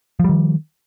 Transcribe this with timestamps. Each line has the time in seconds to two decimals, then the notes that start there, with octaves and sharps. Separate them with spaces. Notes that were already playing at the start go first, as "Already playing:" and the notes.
0.20 F3
0.24 G3
0.29 D#3